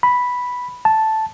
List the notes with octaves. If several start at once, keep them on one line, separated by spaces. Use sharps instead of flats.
B5
A5